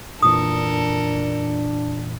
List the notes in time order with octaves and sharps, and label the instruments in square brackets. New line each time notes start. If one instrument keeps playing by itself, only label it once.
[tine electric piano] F2 A#2 E3 [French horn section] D4 [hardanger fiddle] A4 A#4 [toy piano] D#6